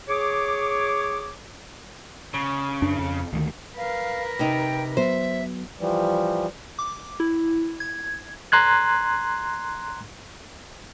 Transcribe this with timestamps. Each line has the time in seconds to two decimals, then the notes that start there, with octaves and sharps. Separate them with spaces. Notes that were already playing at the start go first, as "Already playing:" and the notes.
0.09 G#4 C#5 D6
2.34 C#3
2.82 F#2 D4
2.99 F2
3.33 D2 D#3
3.77 A#4 B4 F5
4.39 C3 D#4 G5
4.97 F#3 B3 C5 E5
5.78 E3 F3 G3
6.79 D6
7.20 E4
7.80 G#6
8.52 A#5 C6 F#6 G#6